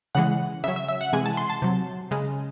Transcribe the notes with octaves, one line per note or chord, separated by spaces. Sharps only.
C#3 E3 G#3 F#5
C#3 F#3 E5
E5
E5
F#5
C3 E3 G#3 G#5
A5
C6
A5
C3 F#3
C#3 G#3